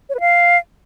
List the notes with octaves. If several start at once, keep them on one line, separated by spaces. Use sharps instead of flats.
C#5
B4
F5